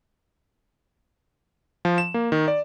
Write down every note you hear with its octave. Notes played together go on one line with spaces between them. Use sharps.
F3
E7
A#3
D#3
D5